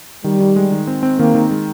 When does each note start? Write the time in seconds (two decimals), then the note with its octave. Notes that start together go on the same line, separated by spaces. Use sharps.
0.24 D#3 G3
0.40 D#3
0.56 G#3
0.72 D#3
0.87 C4
1.03 C4
1.19 D#3 A#3
1.35 D#3
1.51 G#3